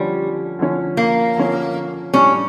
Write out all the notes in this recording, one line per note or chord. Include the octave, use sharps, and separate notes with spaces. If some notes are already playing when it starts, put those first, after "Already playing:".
Already playing: D3 F3 G3 C#4
D3 F3 C#4
A#3
D3 F3 C#4
A2 G3 C#4 D4